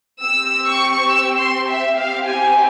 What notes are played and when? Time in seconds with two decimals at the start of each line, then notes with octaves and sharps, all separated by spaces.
0.22 C4 G4 E6
0.66 C#6
1.09 E6
1.39 C6
1.68 E5
1.97 C4 E4 G4 F5
2.27 G#5